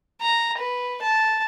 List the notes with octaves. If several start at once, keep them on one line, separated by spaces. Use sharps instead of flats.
A#5
B4
A5